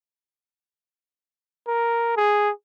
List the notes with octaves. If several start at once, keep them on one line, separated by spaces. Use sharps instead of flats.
A#4
G#4